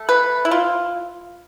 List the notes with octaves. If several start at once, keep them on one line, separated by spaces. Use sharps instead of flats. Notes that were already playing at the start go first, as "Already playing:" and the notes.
Already playing: A3
B4
E4
F4